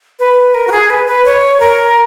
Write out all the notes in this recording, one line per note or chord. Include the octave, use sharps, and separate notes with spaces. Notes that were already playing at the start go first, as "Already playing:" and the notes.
B4
A#4
F#4
G#4
B4
B4
C#5
A#4